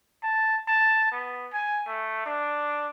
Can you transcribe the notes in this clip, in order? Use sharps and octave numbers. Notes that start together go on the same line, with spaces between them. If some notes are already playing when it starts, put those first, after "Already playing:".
A5
A5
B3
G#5
A3
D4